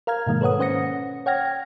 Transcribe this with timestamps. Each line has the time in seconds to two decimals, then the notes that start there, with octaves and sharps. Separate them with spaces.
0.07 A#4 F5 A#5 F6 G#6
0.27 G#2 B2 D#3 G#3 A#3
0.41 A4 B4 C#5 F#5 D#6
0.59 C#4 C5 F#5 D#6 A#6 C#7
1.26 C#5 F#5 G5 F6 G#6 A#6